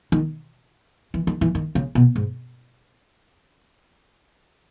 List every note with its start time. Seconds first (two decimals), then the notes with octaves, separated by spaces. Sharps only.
0.12 D#3
1.14 E3
1.27 D#3
1.41 E3
1.55 D#3
1.75 C#3
1.95 B2
2.16 G#2